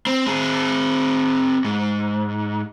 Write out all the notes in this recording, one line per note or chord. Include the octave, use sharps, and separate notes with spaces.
C4
C4 G#4
G#2